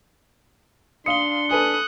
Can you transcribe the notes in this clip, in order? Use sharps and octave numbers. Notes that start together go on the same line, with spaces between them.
D4 F5 C6 D#6 C#7 G7
A4 B4 G#5 D#6 F#6